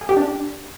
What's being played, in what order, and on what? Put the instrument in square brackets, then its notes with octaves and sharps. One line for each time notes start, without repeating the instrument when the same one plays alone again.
[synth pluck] G#4
G4
D4